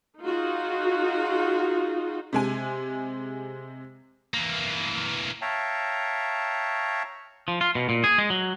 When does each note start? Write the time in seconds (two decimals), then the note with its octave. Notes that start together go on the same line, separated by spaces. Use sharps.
0.22 D#4 F4 F#4 G#4
2.33 C3 G#3 G#5
4.34 E3 A#3
5.42 C#5 E5 F5 G5 A5 A#5
7.48 F3
7.61 F4
7.75 B2
7.89 A#2
8.04 G#4
8.18 G#3
8.30 F#3